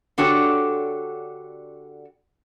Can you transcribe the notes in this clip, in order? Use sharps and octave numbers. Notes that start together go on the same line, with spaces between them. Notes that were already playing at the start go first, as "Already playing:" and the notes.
D3 D4 F#4 G4 A4 C#5